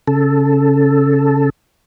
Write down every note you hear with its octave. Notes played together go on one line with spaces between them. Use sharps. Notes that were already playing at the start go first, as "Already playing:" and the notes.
C#3 A4